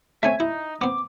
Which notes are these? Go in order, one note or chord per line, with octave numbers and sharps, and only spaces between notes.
A3 C4 C#4 E5 G#5
D#4 E4
B3 C4 D6